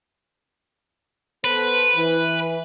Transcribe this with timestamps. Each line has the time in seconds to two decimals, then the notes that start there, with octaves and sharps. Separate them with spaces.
1.44 B3 A4 B4 C5
1.95 E3